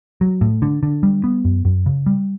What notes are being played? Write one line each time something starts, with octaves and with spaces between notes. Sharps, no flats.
F#3
A2
D3
D3
G3
B3
F#2
F#2
C#3
G3